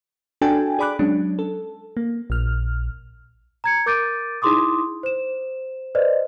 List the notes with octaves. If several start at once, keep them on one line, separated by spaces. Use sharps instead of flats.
D4 F#4 A4 G5 G#5
G#4 D5 B5 D6 F#6
F#3 G#3 C#4 D4
A4
A#3
A#1 F6
A#5 G#6 C#7
A#4 D6 G6 A6 D7 D#7
D#4 E4 G#4 C6 D6 D#6
C5 E7
B4 C5 D5 D#5